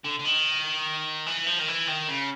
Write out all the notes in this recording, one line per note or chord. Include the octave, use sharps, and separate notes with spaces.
D3
D3
D#3
E3
F3
D#3
E3
D#3
C#3